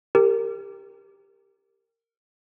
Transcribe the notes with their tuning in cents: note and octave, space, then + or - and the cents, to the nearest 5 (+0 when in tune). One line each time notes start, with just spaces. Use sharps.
G4 +15 A#4 -20